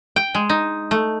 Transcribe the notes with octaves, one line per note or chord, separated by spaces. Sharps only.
G5
G#3
D#4
A3